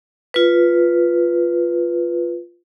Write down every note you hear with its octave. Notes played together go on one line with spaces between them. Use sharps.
F4 B4